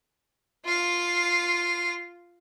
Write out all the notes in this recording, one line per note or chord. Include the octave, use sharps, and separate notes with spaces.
F4 F5